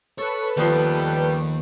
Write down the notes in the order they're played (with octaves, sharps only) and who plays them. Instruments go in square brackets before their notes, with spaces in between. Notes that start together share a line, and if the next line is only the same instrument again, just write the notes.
[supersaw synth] A4 B4 [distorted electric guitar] C#5
[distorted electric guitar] D#2 [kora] F3 B3 [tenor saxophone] G3